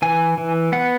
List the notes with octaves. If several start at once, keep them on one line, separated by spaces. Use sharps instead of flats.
E3 G#5
E3
B3 F#5